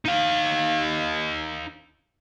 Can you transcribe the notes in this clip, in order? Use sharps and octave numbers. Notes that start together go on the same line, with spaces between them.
D#4 F5